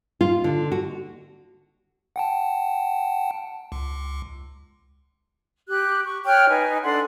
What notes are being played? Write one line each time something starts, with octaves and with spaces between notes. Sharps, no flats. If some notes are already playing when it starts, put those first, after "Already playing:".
F4
D3
F#4
F#5 G5 A5
C#2
G4 F#6
C#6
C#5 G5 F6 F#6
D#4 B4 G#5
D4 A4 F#5 C6